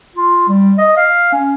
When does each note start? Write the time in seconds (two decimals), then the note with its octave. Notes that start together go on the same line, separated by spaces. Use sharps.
0.16 F4
0.48 G3
0.78 D#5
0.97 F5
1.33 C#4